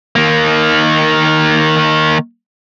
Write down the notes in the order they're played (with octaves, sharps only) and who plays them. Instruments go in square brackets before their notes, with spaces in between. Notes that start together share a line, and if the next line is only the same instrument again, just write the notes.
[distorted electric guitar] D#3 A#3